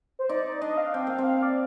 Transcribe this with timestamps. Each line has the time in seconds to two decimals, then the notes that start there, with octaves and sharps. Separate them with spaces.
0.19 C5
0.29 D#4 D5
0.45 D5
0.61 D4 D#5
0.77 F5
0.94 C4 G5
1.07 A#3 F5
1.18 C4
1.26 F5
1.43 D5